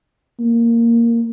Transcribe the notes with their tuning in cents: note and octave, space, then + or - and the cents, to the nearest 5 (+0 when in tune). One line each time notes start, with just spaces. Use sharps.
A#3 -5